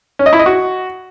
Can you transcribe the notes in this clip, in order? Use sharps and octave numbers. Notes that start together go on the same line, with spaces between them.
C#4
D#5
E4
D#5
F#4